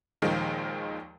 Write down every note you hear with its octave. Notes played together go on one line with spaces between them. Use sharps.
D#2 A#2 D#3 F3 G#3